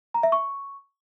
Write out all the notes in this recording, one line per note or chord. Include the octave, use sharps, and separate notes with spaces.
A#5
E5
C#6